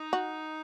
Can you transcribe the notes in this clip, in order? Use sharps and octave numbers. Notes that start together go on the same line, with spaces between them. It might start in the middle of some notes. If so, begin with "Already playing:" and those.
Already playing: D#4
F#4